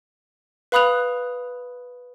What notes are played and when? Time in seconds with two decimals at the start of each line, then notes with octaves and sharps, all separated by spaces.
0.72 B4 F5 B5 D#6 F#6 F7